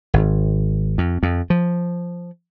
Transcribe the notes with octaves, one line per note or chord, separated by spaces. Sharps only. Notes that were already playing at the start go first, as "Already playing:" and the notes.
G#1
F2
F2
F3